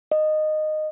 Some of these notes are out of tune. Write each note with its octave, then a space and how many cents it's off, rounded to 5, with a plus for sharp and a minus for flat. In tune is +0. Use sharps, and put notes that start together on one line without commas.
D#5 -15